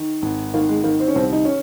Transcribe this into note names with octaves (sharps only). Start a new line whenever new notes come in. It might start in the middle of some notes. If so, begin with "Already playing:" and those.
Already playing: D#3
G#1
D#3 A#3
G#3
D#3 A#3
C4
C#4
C2 C4
D#4
C#4